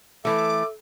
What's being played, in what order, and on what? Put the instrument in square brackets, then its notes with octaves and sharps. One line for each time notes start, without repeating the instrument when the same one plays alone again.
[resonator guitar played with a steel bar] E3 A3 [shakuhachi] A4 [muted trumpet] E5 [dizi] D6